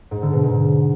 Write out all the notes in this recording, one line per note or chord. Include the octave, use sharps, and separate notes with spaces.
G#2
D3
B2
G#2